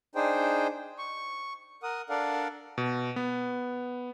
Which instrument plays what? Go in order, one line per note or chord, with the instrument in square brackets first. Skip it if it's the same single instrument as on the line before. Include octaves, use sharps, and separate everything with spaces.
[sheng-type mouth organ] D4 D#4 G#4 C5 G5
C#6
A#4 F#5 D#6
D4 A4 A#4 D5 F5 F#5
[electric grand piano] B2
B3